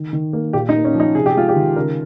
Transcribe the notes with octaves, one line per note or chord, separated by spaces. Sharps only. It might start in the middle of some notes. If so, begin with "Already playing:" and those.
Already playing: D#3
D#3
A#3
A#2 G4
D#4
A#3
C#4
F3
D#4
C3 G#4
G4
G#3 F4
G4
D#3
C#3 A#4